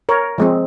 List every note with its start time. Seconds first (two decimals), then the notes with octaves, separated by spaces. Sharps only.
0.09 A#4 C#5
0.38 F3 G#3 C4